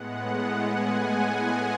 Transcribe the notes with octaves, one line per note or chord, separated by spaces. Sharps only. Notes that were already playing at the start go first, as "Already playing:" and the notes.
Already playing: A2 G#3 B3 F#5
G#5